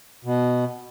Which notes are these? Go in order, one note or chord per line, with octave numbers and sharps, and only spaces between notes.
B2